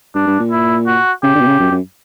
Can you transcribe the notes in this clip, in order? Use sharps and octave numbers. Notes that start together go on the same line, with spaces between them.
G2 D4
G2
A#2
E4
F#4
C#3 G4
D3
B2
C#3
F#2
F#2